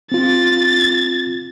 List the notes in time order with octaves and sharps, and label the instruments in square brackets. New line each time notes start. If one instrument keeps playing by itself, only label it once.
[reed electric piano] C4 F4 [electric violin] A6